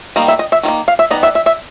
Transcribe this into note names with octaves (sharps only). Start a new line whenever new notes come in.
D#3 G3 A#3 D#5
E5
D#5
E5
D#3 G3 A#3
F5
E5
G3 B3 D#4 D#5
E5
E5
E5